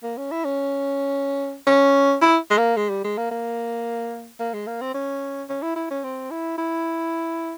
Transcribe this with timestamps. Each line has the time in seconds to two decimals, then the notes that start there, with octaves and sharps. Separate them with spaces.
0.03 A#3
0.17 C#4
0.31 E4
0.45 C#4
1.67 C#4
2.21 E4
2.51 G#3
2.58 A#3
2.77 G#3
2.90 G3
3.04 G#3
3.18 A#3
3.31 A#3
4.40 A#3
4.54 G#3
4.67 A#3
4.82 C4
4.94 C#4
5.49 C#4
5.62 E4
5.76 E4
5.91 C#4
6.04 C4
6.31 E4
6.58 E4